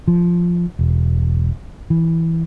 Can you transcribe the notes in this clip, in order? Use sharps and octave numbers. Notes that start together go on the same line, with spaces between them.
F3
E1
E3